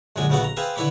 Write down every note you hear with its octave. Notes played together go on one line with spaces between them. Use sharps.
A#1 F#2 D3 G#3 G#5
A#1 C#3 A3 B3 F#4 F#5
A#5
C4 G#4 B4 E5 F5
D3 E3 E4 C#5 B5 D6